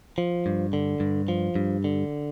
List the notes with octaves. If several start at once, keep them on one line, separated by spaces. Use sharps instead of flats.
F3
G2
D3
G2
F3
G2
D3